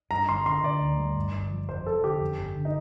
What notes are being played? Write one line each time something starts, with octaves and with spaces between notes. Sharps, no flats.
G2 A#5
G1 C6
D3 C6
D3 D5
D2
G3
G2
G1
F3
F2 C5
F1 A4
D3 G4
F2
G1
D3
D#4